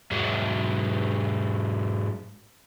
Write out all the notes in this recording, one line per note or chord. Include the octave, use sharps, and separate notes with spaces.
G#2 F#3